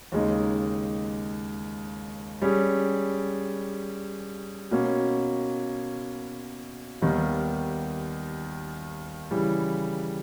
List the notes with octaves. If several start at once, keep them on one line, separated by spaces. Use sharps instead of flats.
D#2 C#3 G#3 D#4
G3 C#4 G#4
B2 A#3 C#4
D#2 D#3 G3 B3
C#3 E3 G3